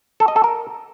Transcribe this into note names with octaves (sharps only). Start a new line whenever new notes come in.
A4
D#5
A4
A#4